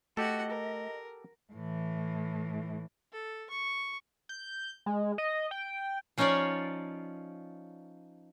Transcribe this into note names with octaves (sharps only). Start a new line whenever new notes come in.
A3 F#4 G4 A4 D#5 F#5
A#4
A2 E3
A4
C#6
G6
G#3
D#5
G5
F3 C#4 D#4 F4 C#5 D5